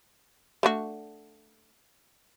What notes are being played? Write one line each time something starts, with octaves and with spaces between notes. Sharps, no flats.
A3 D4 F#4